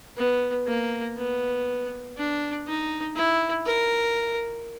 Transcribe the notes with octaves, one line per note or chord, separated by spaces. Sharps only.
B3
A#3
B3
D4
D#4
E4
A#4